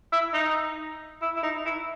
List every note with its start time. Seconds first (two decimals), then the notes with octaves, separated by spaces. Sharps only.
0.12 E4
0.34 D#4
1.22 E4
1.36 E4
1.43 D#4
1.65 E4